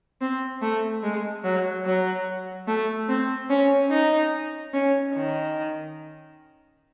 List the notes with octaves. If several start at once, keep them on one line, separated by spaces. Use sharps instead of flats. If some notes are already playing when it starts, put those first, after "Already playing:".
C4
A3
G#3
F#3
F#3
A3
C4
C#4
D#4
C#4
D#3